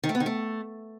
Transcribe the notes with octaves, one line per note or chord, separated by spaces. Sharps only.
D#3
A3
B3
D#3
A3